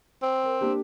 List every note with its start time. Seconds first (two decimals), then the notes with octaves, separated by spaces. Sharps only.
0.23 C4
0.44 A#4
0.61 A#3 D4 G4